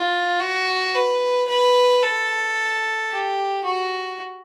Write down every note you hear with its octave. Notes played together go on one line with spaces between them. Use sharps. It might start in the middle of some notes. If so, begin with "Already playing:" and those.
Already playing: F4
F#4
B4
B4
A4
G4
F#4